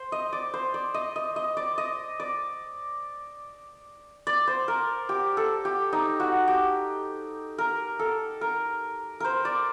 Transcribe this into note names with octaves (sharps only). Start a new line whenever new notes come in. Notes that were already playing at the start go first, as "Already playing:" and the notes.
Already playing: C5
D#5
D5
C5
D5
D#5
D#5
D#5
D5
D#5
D5
D5
C5
A#4
G4
A4
G4
D#4
F#4
G4
A#4
A4
A#4
A#4 C5
D5